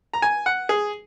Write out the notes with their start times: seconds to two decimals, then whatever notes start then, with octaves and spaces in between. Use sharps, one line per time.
0.14 A#5
0.22 G#5
0.46 F#5
0.69 G#4